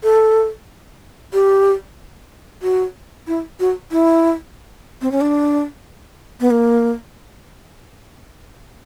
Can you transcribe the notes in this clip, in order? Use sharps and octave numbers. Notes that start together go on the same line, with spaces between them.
A4
G4
F#4
E4
F#4
E4
C4
C#4
D4
B3
A#3